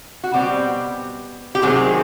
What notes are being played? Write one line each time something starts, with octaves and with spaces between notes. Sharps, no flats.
F#4
B2 G3 C4 G4
G4
C3 D#3 F#3 C4 G#4